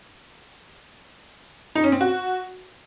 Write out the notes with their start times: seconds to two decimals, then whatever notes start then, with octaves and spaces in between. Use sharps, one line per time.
1.75 D#4
1.84 C#4
1.92 C4
2.01 F#4